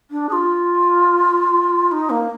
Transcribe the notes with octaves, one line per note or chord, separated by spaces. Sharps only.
D4
G#4
F4
D#4
A#3